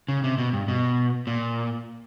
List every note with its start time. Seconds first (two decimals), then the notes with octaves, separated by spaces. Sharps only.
0.08 C#3
0.24 C3
0.38 B2
0.53 G2
0.68 B2
1.27 A#2